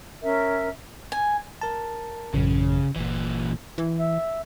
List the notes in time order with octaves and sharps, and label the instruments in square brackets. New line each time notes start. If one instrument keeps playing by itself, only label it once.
[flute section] C#4 A#4 E5
[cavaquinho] G#5
[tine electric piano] A#4 A5
[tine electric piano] A1 F#2 [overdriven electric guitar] C#3
[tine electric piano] G1 [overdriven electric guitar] A#2 E3
[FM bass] E3
[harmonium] E5